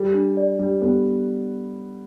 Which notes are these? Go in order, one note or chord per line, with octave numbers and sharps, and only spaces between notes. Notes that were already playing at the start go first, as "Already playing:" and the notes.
Already playing: G3 A4
D4
D5
G3 D4
G3 B3 A4